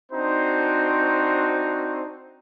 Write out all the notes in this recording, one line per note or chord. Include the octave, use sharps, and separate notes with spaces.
C4 D4 D#4 F#4 C5